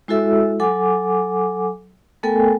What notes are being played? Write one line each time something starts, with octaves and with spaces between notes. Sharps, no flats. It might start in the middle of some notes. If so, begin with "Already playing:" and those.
G#3 E4 F#4 A4 E5 E6
F#3 A4 F#5 G#5 D6
A3 B3 A4 A#4 G5 G#5